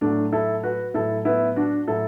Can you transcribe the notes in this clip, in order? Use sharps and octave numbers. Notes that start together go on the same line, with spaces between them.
A2 F#3 A3 D4
E4 A4
F#4 B4
A2 F#3 E4 A4
B3 E4
D4 F#4
A2 F#3 E4 A4